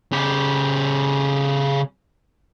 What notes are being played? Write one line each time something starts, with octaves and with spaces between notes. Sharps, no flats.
C#3 G4